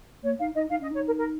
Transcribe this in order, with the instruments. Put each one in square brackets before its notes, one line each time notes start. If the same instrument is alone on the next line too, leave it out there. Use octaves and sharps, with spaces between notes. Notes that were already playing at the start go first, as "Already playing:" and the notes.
[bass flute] A#3 [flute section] C#5
[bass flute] D#4 [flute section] F5
[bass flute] D#4 [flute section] D#5
[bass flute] D#4 [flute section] F5
[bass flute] C#4 [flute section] D#5
[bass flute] D#4 [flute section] C#5
[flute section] A#4
A#4